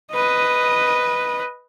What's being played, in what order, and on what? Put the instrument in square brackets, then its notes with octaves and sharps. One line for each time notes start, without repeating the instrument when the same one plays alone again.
[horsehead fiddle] B4 D#5